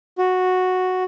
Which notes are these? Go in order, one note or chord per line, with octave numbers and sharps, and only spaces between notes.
F#4